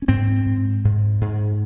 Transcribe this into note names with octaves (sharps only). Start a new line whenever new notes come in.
C#4
G#2 C4
G#2
G#2
G#2